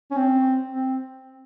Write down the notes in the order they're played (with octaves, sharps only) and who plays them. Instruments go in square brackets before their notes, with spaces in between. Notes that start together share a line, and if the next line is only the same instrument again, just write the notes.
[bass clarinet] C#4
C4
C4